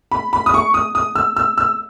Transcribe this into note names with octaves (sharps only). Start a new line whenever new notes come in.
B5
B5
D#6
C#6
D#6
D#6
E6
E6
E6